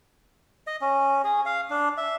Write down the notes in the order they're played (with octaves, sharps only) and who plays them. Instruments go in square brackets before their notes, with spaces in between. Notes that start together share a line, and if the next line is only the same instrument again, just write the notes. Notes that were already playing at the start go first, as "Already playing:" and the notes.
[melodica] D#5
C#4
G#4
F5
D4
E5